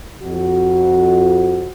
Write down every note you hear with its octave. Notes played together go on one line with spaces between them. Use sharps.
F2 F#4